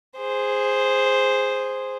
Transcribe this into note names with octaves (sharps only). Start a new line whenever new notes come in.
G#4 C5